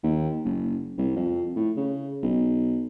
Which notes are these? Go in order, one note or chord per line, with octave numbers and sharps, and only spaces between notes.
D#2
F#1
C2
F2
A2
C#3
B1